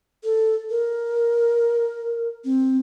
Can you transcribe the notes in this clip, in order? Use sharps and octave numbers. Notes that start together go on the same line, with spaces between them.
A4
A#4
C4